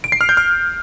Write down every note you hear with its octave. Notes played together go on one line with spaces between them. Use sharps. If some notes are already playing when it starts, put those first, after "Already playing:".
D7
C7
F6
G6
F6